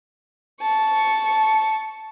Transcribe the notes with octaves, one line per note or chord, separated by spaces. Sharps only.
A5 C#6